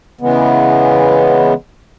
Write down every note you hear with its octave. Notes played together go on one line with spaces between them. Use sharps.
C#3 E3 G#3 B3